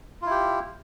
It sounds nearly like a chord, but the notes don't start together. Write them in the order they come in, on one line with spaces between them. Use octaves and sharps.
F4 E4 G4